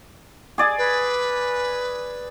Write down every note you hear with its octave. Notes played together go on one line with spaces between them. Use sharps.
G#4 D5 G#5
B4